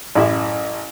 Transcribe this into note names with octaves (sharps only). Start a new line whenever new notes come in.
A1 F#2 E4 G4 E5